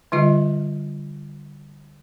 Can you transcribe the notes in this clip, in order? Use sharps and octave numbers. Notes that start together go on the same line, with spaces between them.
D3 G3 F4 D#5